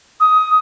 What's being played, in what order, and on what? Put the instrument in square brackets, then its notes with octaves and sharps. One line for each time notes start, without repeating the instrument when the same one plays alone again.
[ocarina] D#6